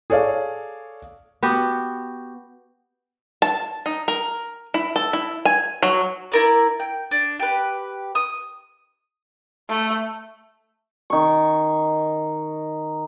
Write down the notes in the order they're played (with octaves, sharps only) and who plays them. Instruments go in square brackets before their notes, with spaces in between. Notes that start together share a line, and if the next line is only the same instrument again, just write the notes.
[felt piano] G#4 A4 C#5 D5 F5
[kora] B3 F#4 G4
[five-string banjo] A5
D#4
A#4
E4
A4
E4
G#5
F#3
[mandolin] E4 A#4 D5
G5
D4
G4 B4
D#6
[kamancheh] A3
[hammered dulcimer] D#3 C#6